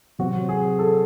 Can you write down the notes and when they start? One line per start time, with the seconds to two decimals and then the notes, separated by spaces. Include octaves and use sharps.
0.19 C3 F#3 C4 F#4
0.49 G#4
0.79 A4